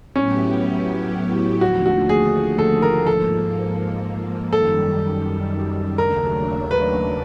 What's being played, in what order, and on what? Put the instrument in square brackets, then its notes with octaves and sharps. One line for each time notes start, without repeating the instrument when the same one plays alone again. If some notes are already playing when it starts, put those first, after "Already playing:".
[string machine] A2 F#3 B3 E4 G4 [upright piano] C#4
[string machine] D#2 D3 F3 A3 [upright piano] F#4
[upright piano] F#4
G#4
A4
A#4
[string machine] G#2 F3 A#3 [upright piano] A4
[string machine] F#2 D#3 G3 [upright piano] A4
[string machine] D#2 C#3 F#3 A3 D4 [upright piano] A#4
[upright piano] B4